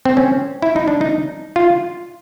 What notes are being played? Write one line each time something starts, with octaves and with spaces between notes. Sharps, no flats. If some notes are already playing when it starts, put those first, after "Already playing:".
C4
C#4
E4
D#4
D4
D#4
F4